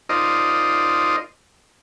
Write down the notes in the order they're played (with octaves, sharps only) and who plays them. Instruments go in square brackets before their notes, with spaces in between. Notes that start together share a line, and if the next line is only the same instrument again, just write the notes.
[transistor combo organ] D#4 F4 A#4 C5 D5 D#5